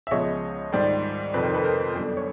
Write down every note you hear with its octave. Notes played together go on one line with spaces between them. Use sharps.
E5
C#2 C#3 F3 G#3 B3 C#5 D#5
G#2 D#3 G3 C5 D5
F2 C3 D#3 A4 B4
A#4 C5
A4 B4
A#4 C5
F#2 D3 G3 B3 D4
C#5